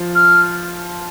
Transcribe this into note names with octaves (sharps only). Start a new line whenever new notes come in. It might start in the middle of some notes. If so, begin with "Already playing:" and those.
Already playing: F3 F4
F6